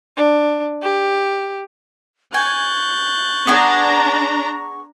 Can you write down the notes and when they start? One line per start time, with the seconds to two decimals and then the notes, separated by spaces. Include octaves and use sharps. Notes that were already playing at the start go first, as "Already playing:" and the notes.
0.17 D4
0.82 G4
2.34 G#5 C#6 F#6 G6 A6
3.47 B3 D4 G#4 G#5 A#5